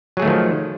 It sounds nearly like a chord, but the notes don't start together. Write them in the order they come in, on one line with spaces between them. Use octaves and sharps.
F#3 G#4 A3 D#3 F3